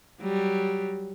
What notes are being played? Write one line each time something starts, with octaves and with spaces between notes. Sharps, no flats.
F#3 G3